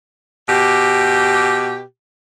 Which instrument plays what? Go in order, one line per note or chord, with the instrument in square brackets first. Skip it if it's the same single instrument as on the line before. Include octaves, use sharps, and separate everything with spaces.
[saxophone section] B2 G4